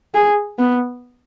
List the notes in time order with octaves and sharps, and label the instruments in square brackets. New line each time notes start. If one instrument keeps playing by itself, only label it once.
[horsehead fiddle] G#4
B3